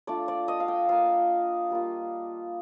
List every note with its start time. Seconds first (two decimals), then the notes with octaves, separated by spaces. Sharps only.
0.07 A3 D4 F4 D5
0.28 D5
0.48 D#5
0.60 F5
0.68 G5
0.89 A#3 F4 F5
1.71 G3 A#3 F4